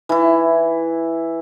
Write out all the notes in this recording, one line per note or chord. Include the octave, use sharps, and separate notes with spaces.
E3 E4